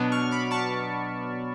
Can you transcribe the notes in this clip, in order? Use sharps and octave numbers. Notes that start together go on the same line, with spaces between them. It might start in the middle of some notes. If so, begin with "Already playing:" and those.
Already playing: B2 F#3 B3 D4
C#6 F6
B5 D6
A5 C#6